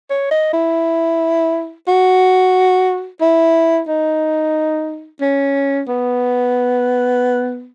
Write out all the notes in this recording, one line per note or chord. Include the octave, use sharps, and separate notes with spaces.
C#5
D#5
E4
F#4
E4
D#4
C#4
B3